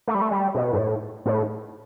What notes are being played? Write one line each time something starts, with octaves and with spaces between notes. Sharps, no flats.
A3
G3
A3
G3
B2
G2
A2
A2